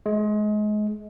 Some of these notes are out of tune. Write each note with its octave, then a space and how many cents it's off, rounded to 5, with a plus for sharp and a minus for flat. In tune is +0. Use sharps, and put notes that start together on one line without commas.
G#3 +30